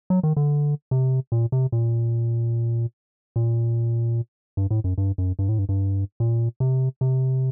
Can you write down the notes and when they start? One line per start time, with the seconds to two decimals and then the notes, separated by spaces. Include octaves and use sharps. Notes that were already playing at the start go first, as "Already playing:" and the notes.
0.10 F#3
0.23 D#3
0.37 D3
0.91 C3
1.32 A#2
1.52 C3
1.72 A#2
3.36 A#2
4.57 G2
4.71 A2
4.84 F#2
4.98 G2
5.18 F#2
5.39 G2
5.49 A2
5.59 G2
5.69 G2
6.20 A#2
6.60 C3
7.01 C3